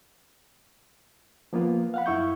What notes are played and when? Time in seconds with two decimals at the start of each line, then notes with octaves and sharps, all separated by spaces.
1.53 F3 A#3 B3 F4 B4
1.94 F5 F#5 B5
2.06 F#2 E4 C#6 G6